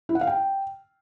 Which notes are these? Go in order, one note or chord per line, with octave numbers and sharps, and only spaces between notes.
E4
F#5
F5
G5